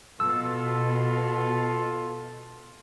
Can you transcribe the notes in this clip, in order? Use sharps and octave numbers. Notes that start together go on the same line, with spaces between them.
B2 F4 A4 E6